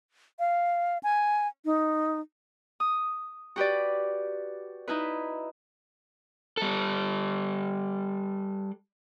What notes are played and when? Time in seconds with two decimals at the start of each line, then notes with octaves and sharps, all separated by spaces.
0.39 F5
1.03 G#5
1.65 D#4
2.80 D#6
3.56 F#4 G4 B4 D5
4.88 D#4 E4 B4
6.57 G3 A4